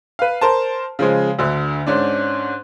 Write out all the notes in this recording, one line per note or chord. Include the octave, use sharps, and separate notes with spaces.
B4 F5
A#4 C5 A5
C#3 F3 G#3
D2 D3
G#2 C#4 D4